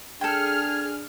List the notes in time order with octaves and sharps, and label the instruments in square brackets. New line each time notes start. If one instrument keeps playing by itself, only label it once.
[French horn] D4 [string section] G#4 F6 [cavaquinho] A4 G5 [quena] G#6